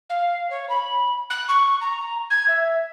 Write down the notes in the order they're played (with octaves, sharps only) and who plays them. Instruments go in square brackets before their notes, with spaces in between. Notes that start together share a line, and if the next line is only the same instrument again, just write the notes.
[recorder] F5
C#5
B5
F#6
C#6
A#5
G#6
E5